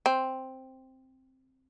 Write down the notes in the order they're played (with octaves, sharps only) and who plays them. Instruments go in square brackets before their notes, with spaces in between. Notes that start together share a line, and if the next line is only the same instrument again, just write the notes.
[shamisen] C4